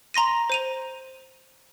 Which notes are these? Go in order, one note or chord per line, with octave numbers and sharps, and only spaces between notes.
A#5 C6 A#6 D#7
C5 D#7 F7